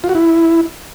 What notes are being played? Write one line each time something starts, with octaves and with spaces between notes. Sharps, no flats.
F4
F#4
E4